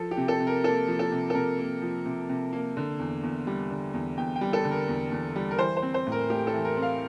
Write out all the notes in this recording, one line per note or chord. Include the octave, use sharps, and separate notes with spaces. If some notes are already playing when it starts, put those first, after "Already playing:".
Already playing: F3 A4
G4
C3
A4
C3
A#4
A#3 A4
F3
A4
C3
A4
C3 A#4
A#3
F3
C3
C3
A#3
D3
E2
E2
G3
D3
E2
E2 G5
G5
G3
A4
D3
A#4
E2
E2
G3
A#4
E3 C5
C5
C4
C5
A2
A#4
A3 G4
A4
E3
A#4
C4
F5